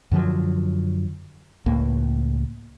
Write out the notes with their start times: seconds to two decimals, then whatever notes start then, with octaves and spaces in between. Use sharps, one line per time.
0.12 F#2 D3 F3 F#3
1.66 C#2 A2 A#3